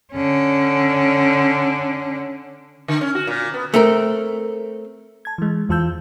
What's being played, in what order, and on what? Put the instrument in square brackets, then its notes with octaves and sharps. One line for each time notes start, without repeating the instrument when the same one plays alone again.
[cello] D3 C#4
[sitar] D3
C#4
F#4
A#2
B3
[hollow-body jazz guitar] A3 C4 A#4
[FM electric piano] A5 G#6
E3 G#3
E2 E3 F4 A5 E6 G6